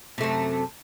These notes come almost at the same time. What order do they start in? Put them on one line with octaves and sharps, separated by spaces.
C3 A3 F#2